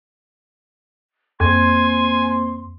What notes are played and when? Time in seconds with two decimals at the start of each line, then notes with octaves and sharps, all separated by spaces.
1.40 F2 A#3 C4 C5 G#5 C6 G#6